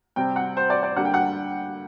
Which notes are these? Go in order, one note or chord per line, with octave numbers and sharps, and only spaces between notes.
C3 G3 C4 G5
F#5
C5
D5
D5
D3 G3 A#3 D4 F#5
G5
F#5